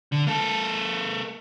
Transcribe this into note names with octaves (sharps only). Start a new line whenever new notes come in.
D3
A#3 A4